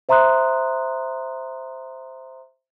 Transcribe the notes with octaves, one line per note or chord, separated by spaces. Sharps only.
C5 E5 A#5 C6 D#6 F#6